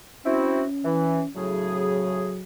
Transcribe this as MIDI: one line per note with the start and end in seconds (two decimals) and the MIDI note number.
0.25 0.63 60
0.25 1.28 61
0.25 0.63 64
0.25 0.63 66
0.85 1.22 52
1.36 2.42 45
1.36 2.42 49
1.36 2.42 54
1.36 2.42 68